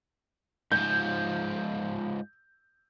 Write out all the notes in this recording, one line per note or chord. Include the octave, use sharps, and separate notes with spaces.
G#2 F3 G6